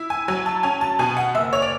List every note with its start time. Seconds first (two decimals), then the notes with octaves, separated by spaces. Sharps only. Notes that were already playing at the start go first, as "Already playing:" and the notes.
Already playing: E4
0.10 G#5
0.28 F#3 G#5
0.46 A5
0.63 C#4 G#5
0.81 A5
0.99 B2 G#5
1.17 F#5
1.35 F#1 E5
1.53 C#5
1.62 D5